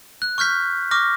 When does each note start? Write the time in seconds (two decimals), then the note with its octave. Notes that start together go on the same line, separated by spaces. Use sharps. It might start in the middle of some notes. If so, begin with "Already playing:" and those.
0.22 F#6
0.38 C#6 F6 G6 B6
0.91 C#6 D6 F6 A#6